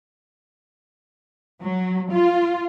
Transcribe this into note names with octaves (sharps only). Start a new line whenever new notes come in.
F#3
F4